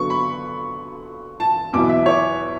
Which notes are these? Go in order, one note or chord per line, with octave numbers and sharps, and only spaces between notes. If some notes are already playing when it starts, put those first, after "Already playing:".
Already playing: D3 F#3 B3 C#6
B5
A5
E2 B2 F#3 B3 E4 D6
E5
C#5